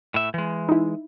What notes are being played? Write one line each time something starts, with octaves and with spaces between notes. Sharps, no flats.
A2 E5
E3 G#3
D#4 E4